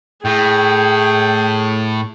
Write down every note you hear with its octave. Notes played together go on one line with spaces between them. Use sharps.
A2 G#4 G5